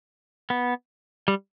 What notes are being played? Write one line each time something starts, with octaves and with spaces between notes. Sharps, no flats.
B3
G3